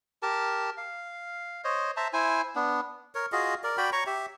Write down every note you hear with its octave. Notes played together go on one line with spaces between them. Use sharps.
G4 A#4 A5
F5
C5 C#5 D#5
C5 E5 A5 A#5
E4 C5 G#5
B3 D4
A#4 C#5
F4 F#4 G#4 D#5
A#4 D5
F#4 D5 G5 B5
C#5 A#5 C#6
G4 E5